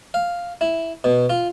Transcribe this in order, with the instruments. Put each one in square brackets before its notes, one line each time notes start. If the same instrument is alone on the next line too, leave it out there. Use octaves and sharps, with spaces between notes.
[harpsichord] F5
E4
B2
F4